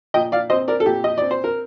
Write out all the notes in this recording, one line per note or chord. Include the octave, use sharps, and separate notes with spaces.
A#2 D#5 G5
D5 F5
C4 C5 D#5
A#4 D5
A4
A#2 G4
D#5
C4 D5
C5
A#4